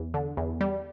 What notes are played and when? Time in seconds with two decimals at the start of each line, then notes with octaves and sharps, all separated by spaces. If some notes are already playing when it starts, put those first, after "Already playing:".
Already playing: E2
0.14 D3
0.37 E2
0.61 G3